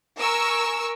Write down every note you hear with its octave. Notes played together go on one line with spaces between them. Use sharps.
A#4 G#5 C#6 E6